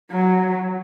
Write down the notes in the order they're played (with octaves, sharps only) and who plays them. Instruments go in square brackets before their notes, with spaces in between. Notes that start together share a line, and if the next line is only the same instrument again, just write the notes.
[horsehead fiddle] F#3